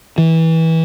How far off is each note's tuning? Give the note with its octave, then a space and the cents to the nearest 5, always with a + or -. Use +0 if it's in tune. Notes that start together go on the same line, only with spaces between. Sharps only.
E3 -20